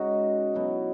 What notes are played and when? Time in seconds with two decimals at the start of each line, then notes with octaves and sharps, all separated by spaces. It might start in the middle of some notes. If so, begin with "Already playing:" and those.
Already playing: C#3 G#3 D#4 F#4
0.54 B2 F#3 B3 E4